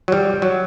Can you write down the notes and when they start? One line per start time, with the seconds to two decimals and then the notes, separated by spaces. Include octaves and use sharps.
0.08 F#3
0.12 G3
0.42 F#3